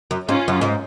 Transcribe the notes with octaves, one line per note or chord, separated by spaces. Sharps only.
F#2
G#2 C#4 F4
F#2
G#2